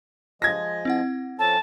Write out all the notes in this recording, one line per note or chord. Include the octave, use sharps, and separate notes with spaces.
F3 G#3 D#5 G#6 A#6
C4 E4 F#5
F3 C#4 A4 A5